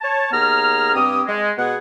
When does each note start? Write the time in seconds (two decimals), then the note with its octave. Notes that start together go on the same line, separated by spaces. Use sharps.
0.01 C#5 A5
0.31 D#2 B3 G#4 A#5 F6
0.94 G2 C4 G4 D#6
1.27 G#3
1.58 B2 B3 G#4 F#5